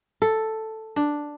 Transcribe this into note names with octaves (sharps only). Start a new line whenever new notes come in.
A4
D4